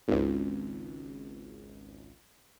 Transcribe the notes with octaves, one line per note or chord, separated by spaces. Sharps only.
G#1 C#2